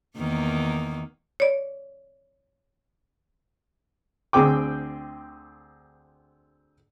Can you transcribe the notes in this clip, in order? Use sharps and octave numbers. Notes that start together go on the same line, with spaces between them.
E2 D#3 A#3
C#5 D5
D2 C4 G#4 G5 D6